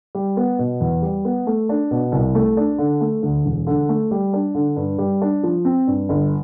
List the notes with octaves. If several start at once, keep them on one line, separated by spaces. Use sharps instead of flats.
G3
B3
B2
E2
G3
B3
A3
D4
B2
C2
A3
D4
D3
A3
D2
E1
D3
A3
G3
D4
D3
G2
G3
D4
F3
C4
G2
G1